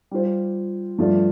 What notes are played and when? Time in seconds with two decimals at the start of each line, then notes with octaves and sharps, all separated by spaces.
0.11 G3 F4 C5
0.98 G2 F3 A3 F4 D5